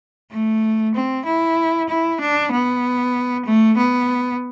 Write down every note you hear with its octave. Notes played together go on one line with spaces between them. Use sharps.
A3
C4
E4
E4
D4
B3
A3
B3